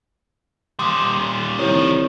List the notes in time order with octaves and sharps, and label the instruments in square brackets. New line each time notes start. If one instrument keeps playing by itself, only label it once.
[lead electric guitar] A#2 G3 [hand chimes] C6 D#6
[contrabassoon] C2 [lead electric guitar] D#3 F3 [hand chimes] C#5